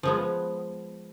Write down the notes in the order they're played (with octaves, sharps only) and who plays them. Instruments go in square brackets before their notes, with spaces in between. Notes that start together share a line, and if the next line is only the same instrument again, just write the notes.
[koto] F3 G#3 B3